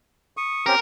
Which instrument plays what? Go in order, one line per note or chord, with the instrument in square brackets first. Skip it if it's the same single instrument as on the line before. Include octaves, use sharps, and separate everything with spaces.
[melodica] C#6 D#6
[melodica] C4 C#4 G4 [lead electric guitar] A#4